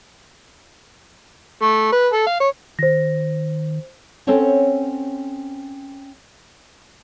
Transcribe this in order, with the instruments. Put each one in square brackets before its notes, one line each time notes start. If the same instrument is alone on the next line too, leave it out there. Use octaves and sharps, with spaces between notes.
[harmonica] A3
B4
A4
F5
C#5
[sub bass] D#3 [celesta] C5 A#6
[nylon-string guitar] C4 C#4 A4 C5 C#5 F#5